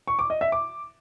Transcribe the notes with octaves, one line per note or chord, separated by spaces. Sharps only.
C#6
D6
D#5
E5
D6